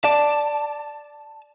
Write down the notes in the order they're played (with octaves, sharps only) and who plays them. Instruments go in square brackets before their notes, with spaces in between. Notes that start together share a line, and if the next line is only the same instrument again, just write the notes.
[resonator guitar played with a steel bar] D5 [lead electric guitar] A5